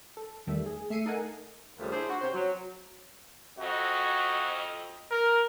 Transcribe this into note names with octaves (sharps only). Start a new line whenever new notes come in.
A4
E2 D#3 G3 A3 E5
G#4
A3 E5 C7 C#7 D#7
D#4 A4 A#4 D#5 F#5 G#5
D#2 C#3 F3 G3 A3
D4 E4 G#4 C5
F#4
C3 C#4 C5
F#3
F2 F#4 D#5
A#4